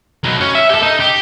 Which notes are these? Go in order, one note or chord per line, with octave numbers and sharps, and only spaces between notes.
F#3 D#4
C#4
E5
G4 A4
D#4
G4